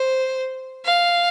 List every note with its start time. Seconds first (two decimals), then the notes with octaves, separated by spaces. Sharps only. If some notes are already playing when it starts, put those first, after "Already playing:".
Already playing: C5
0.85 F5